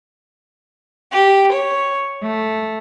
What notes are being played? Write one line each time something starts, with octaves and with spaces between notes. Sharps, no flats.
G4
C#5
A3